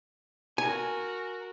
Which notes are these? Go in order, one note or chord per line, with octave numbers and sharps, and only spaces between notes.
F#4 A#4 G#5